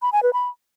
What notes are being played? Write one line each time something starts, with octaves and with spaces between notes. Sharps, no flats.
B5
G#5
B4
B5